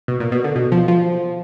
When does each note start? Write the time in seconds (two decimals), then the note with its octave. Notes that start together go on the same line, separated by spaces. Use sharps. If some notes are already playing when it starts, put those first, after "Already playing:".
0.08 B2
0.20 A#2
0.32 B2
0.44 D3
0.56 B2
0.72 F3
0.88 F3